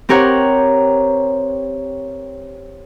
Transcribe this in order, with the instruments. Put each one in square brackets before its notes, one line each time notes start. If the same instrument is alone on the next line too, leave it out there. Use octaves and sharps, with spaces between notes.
[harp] C4 G4 A#4 C#5 F#5